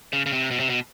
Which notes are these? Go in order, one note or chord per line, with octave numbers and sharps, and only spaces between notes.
C#3
C#3
C3
B2
C3
B2